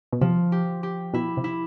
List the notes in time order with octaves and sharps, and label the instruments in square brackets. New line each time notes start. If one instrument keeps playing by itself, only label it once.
[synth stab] B2
[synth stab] C3 [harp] F3
[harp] G4
G4
[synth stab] B2 [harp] E4
[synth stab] C3
[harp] E4